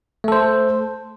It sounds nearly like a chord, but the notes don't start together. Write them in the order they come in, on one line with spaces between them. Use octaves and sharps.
A3 A4 C5